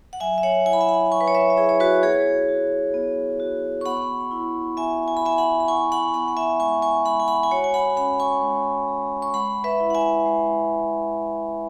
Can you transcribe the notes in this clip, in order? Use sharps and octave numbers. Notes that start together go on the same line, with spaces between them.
F#5
F#3 E5 G#5
E5
C#5 F#5
E4 G#5
B5
E5 G#5
F#5 B5
F#3 G#5 C#6
B4
C#5
B4 E5
E5
E4 G#4 C#5
C#5
F#4 B4
B3 G#4 C#5
F#4
B3
F#4
C#6
B3 F#5 B5
E4
B3 E5 G#5
G#5
B5
E4 E5 G#5
F#5 B5
B5
E4 G#5 C#6
F#5 B5
B3 F#5 B5
F#5
E5 G#5
G#3 G#5 C#6
G#5 C#6
G#3 F#5 B5
G#5
F#5 B5
G#5
F#4 C#5 F#5
G#5
F#5 B5
C#4 F#5 B5
G#5 C#6
G#3
G#3
C#6
G#3 F#5 B5
B4 E5
E4
F#5
E5 G#5
G#3